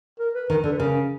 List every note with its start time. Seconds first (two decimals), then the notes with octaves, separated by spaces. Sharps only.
0.19 A#4
0.35 B4
0.49 D#3 A#4
0.64 D3 A4
0.71 B4
0.78 C#3 A#4